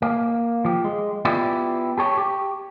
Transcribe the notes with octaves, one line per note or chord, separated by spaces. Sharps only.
A#3
F3 G4
G#3
B3 E4 F4 G4 D5
G4 A4 C#5
G4